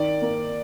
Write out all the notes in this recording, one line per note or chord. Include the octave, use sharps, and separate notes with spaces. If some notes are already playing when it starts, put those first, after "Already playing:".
Already playing: D#3 D5
A#3